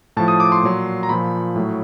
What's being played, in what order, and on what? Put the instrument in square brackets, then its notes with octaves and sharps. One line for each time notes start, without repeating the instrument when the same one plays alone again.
[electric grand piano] A2 F3 A5
D#6
D6
C6
A#2 F#3
A#5
A#2 F3 B5
A2 F#3